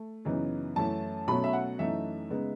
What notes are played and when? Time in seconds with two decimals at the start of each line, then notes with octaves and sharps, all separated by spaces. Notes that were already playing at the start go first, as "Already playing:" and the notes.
Already playing: A3
0.25 F#2 C#3 E3 B3 D#4
0.76 F#2 E3 A3 C#4 E4 A5
1.28 B2 F#3 A3 C#4 B5
1.44 E5
1.53 F#5
1.79 F#2 E3 A3 D#4 E5
2.30 C#3 G#3 B3 D#4